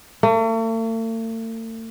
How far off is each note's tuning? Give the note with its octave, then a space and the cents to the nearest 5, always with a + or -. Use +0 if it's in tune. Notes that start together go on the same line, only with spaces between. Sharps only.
A3 +45